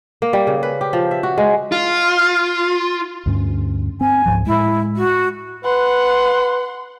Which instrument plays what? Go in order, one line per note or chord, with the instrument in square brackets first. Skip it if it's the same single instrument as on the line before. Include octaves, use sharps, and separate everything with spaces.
[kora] A#3
G3
C#3
B4
G4
F3
E5
F#4
G#3
[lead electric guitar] F4
[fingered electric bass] D2 G2 C#4
[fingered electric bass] C4 [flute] G#5
[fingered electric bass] C#2 G#2 F3
[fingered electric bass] A2 G#3 [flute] E4
[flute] F#4
[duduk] B4 [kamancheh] F#5 C6